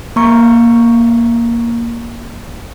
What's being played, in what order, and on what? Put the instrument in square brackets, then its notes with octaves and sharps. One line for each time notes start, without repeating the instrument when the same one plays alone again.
[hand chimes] A#3 A#5 C#6